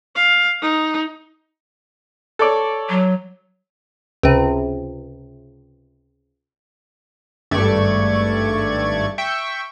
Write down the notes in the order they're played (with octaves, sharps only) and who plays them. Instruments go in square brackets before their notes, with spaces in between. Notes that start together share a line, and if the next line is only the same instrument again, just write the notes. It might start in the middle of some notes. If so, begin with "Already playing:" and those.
[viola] F5
D#4
[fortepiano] A4 C#5 D5
[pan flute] F#3
[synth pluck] C#2 C3
[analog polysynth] G#1 G2 A3 D5 C#6 G#6
E5 G5 C#6